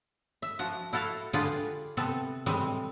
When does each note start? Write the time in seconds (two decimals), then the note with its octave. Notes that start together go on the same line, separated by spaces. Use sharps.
0.42 E5
0.59 F3 F#4
0.93 E4 F#4 A4 F5
1.33 D3 F4 G4 G#4 B4 D5
1.97 C3 B3 C4 A4
2.46 A2 E3 G3 G#3 C4